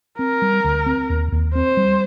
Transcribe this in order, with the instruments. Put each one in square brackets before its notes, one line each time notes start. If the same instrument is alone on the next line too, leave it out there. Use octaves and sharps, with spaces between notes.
[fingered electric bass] C4 [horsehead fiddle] A#4
[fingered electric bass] G3
D2
C4
D#2
D#2
[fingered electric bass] C4 [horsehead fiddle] C5
[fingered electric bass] G3